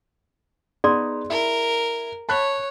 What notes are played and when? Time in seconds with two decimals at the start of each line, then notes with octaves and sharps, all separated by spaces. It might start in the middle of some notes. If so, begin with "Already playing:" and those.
0.84 B3 D#4 G#4 D5 C6 D#6
1.30 E4 A#4
2.29 C#5 A5 B5 F#6